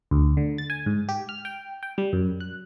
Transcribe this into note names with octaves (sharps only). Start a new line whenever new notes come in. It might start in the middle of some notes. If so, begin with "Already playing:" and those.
D2
D3
A6
G#5
G#2
G4
F6
G5
G5
G3
F#2
F#6